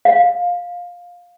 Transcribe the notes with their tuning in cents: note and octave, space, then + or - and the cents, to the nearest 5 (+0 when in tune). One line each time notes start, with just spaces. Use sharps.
F5 +15